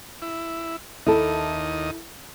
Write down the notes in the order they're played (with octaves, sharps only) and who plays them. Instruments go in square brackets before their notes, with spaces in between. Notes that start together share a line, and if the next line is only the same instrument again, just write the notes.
[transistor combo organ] E4
[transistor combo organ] D#2 D#5 [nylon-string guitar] E4 A4